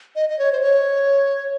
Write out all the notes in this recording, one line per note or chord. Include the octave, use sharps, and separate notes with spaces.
D#5
D#5
C#5
C5
C#5